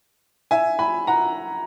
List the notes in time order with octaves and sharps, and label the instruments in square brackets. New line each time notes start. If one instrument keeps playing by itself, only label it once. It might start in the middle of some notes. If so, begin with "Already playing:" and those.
[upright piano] E5 G#5
G#5 B5
F#5 A#5